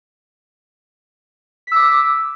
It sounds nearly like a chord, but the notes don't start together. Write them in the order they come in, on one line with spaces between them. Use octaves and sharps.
B6 E6 D6